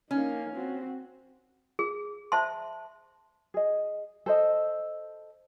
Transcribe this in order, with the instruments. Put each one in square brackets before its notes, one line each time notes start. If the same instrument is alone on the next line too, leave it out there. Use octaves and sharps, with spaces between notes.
[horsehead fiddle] A#3 D#4 [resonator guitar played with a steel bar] C#4
[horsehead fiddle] C4 F#4
[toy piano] G#4
C5 E5 A5 C6
[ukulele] G#4 D#5
A4 C5 D#5